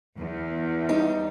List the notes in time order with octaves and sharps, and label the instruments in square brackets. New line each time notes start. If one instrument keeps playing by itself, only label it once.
[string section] E2
[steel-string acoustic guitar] G3 D#4